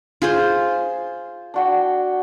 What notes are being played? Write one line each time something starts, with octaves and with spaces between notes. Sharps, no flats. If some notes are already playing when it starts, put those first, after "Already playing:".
F4 G#4 C5
D4 F#4 G5